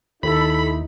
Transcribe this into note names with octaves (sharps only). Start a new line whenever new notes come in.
D#2 D#4 E4 A4 B5